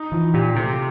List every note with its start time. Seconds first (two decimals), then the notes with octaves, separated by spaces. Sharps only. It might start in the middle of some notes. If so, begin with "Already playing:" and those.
Already playing: D#4
0.12 E3 F3
0.34 A#2 G4
0.56 C3 A3